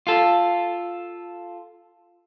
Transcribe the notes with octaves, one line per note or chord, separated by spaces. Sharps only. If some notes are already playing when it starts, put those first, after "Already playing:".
F4 A4